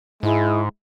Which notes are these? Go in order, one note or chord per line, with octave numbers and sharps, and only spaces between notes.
G#2 G#3 E4